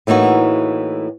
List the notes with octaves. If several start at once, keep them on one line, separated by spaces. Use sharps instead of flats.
A2 E3 A#3 D#4 F#4